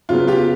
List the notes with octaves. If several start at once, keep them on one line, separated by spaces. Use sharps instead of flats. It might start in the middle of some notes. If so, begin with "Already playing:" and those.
C#3 F#3 B3 F4
F4 G4